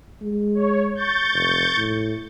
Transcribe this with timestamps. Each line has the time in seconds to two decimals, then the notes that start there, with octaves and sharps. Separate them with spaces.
0.22 G#3
0.55 C#5
0.93 C#6 G6 A6
1.34 F1
1.78 A2